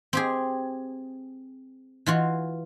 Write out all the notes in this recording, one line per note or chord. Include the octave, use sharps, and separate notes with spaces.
C4 G4 G#4
E3 F4 F#4